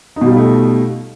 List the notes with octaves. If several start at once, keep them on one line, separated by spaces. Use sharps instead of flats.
B2 G3 A3 D#4 F4